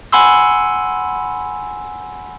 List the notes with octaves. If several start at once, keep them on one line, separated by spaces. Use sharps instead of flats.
F#5 G#5 B5 C6 E6